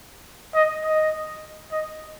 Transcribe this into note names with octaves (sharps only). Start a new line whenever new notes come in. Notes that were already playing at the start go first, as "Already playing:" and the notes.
D#5
D#5
D#5